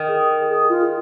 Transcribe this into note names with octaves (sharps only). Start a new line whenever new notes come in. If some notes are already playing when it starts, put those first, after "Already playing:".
Already playing: D#3
G#4
G#4
F4